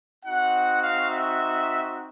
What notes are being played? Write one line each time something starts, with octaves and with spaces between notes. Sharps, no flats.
C4 D#4 F#4 F#5
F5
E5